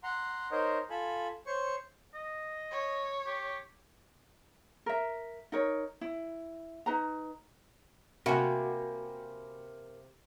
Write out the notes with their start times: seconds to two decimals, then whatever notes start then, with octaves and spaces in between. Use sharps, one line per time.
0.03 F#5 A#5 C6
0.51 D#4 A#4 C5 C#5 D#5
0.90 F4 A4 G#5 B5
1.46 C5 C#5 C#6
2.14 D#5
2.71 C#5
3.26 G4
4.86 A#4 E5
5.52 D#4 A#4 C#5
6.01 E4
6.86 D#4 B4 A#5
8.26 C3 A#3 F#4 A#4 E5 G5 G#5 B5